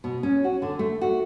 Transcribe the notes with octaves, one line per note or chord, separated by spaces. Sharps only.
B2
C#4
F#4
D3
A3
F#4